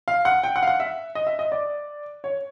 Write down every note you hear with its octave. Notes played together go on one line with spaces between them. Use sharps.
F5
F#5
G5
F#5
F5
F#5
E5
D#5
E5
D#5
D5
C#5